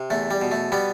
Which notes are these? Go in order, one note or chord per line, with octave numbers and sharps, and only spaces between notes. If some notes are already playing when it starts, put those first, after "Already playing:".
Already playing: C3
E2 A3
G3
B2
A3
G3 B3